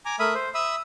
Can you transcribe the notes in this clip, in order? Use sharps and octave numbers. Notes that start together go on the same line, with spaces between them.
G#5 A#5 D6
A3 A#4 E5 B5 D#6
C5
E5 B5 D#6 E6